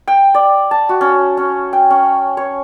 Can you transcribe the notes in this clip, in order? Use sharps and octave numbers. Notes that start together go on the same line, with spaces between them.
G5
D5
A5
F#4
C#4
C#4
G5
C#4
C#5